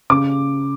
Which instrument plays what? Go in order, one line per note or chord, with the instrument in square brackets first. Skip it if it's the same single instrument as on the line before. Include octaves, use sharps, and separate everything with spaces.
[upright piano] C#3 D6